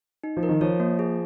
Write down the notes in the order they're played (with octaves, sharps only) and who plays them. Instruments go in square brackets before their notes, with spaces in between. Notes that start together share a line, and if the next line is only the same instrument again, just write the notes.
[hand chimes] D#4
[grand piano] F3
[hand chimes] A#4
[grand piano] D#3
[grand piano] F3 [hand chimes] C#5
[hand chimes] A#3
G#4